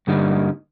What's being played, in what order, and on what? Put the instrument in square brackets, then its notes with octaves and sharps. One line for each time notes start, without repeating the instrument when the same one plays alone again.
[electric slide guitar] G2 D3 G3 A#3 D#4